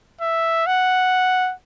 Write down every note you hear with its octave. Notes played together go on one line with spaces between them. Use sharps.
E5
F#5